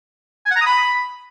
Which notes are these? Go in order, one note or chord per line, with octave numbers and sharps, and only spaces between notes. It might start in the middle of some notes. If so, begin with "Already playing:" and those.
G#5
F#5
A#5
D#6
B5